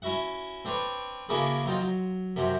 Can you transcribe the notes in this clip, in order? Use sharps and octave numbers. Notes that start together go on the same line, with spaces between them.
C#4 E4 F#4 E5 F#5
C4 D4 B4 C#5
C#3 A#3 D4 E4 F#4 G#4
F#3 C4 D#4 F4
F#3
F#2 C3 F#3 C4